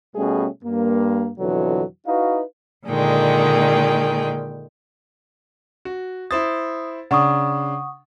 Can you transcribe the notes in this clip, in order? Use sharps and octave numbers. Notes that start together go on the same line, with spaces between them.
B2 G3 A3 C#4 G#4
G2 A#3
F2 B2 D3 E3 F#3
D#4 E4 F#4 B4 F5
A#2 D3 D#3 G#3 G5
F#4
E4 C5 D#6 A6
C#3 D4 F#5 C#6 D#6